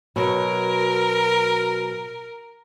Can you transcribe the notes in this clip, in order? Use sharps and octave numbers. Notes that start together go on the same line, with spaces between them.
B2 F#3 A#4